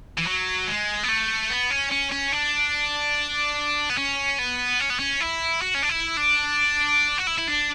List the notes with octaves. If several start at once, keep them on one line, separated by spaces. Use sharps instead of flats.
E3
F#3
G#3
B3
A3
B3
C#4
C#4
C#4
D4
B3
C#4
B3
C#4
B3
C#4
E4
F#4
C#4
D4
E4
D4
F#4
E4
E4
D4